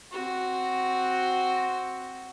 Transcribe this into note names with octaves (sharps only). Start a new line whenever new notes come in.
C4 F#4